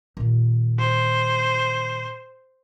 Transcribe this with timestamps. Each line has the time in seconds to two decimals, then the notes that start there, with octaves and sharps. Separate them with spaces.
0.17 A#2 D#3
0.79 C5